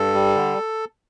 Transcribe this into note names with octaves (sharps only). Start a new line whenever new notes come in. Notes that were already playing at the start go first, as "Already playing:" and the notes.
Already playing: G2 A4
G3
D3